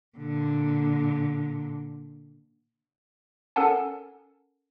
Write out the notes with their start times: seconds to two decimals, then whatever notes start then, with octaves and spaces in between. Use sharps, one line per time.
0.17 A#2 D3
3.56 C#4 A4 A#4 F#5 G#5 A5